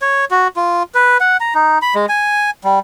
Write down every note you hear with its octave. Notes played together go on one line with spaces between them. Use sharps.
C#5
F#4
F4
B4
F#5
A#5
D#4
B5
G#3
G#5
G3